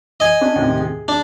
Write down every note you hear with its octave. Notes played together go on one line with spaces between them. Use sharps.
D#5 G#5
C#4 D4
D#2 A2 C3
G#4
D4